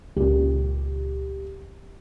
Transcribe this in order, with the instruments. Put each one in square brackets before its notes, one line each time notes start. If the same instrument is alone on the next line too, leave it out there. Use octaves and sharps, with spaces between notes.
[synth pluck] C#2 A#2 [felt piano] G4